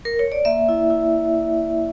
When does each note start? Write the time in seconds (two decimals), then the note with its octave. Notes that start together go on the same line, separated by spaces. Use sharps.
0.05 A#4
0.19 C#5
0.32 D5
0.45 A#3 E5
0.68 E4
0.90 E4